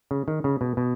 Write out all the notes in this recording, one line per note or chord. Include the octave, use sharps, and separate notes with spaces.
C#3
D#3
C#3
B2
B2